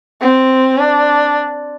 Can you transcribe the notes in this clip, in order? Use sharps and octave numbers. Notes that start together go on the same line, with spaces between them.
C4
D4